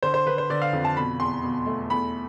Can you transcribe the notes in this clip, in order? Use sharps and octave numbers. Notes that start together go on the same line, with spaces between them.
D3 C5
C5
D3 B4
C5
D3 D5
F5
F2
A5
B2 B5
E2 C6
B2
A3
E2 B5